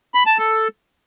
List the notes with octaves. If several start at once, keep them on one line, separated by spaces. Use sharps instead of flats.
B5
A5
A4